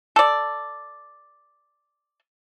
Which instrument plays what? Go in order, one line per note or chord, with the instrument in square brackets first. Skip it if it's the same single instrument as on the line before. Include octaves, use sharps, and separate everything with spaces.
[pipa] A4 D5